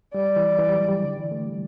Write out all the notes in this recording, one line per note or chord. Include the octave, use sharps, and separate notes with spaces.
G3 D5
E3
E3
G3
F#3
G3
D3
E3
A3
G3